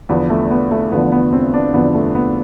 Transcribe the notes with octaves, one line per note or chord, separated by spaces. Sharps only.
E2 D3 F3 B3
A3
B3
A3
E2 D3 F3 B3
B3
C4
D4
E2 D3 F3 B3
A3
B3